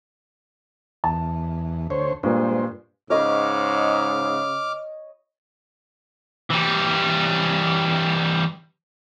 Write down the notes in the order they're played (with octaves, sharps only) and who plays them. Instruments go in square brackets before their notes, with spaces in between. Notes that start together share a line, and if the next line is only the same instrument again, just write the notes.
[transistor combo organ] E2 [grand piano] A5
[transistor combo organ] D2 C5 C#5
[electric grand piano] G2 A#2 B4 [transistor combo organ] G#3 C5
[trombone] G#2 [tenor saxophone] C#3 [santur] C#5 D#5 B5 [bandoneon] D6 F6
[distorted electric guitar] E3 G3